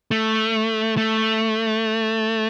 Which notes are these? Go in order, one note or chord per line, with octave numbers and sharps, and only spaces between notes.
A3
A3